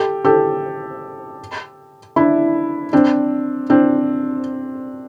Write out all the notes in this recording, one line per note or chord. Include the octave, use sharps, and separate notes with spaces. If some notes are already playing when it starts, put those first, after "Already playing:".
Already playing: G4 A4
G4 A4
D4 E4
C4 D4
C4 D4